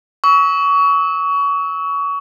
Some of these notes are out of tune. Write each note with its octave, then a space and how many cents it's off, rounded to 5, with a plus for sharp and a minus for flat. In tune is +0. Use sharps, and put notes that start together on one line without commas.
C#6 +25 E6 -35